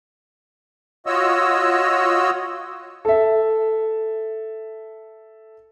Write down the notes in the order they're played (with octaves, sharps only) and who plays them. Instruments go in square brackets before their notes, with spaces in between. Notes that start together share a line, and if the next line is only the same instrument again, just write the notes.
[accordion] F4 F#4 C#5 D#5 E6
[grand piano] A4 E5